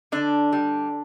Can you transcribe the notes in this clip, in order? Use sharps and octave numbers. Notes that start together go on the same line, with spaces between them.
D3 D4
G3